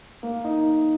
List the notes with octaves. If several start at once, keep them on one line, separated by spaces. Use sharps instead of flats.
A#3
D#4